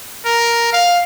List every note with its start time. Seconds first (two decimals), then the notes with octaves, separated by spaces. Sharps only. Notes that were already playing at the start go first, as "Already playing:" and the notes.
0.25 A#4
0.73 F5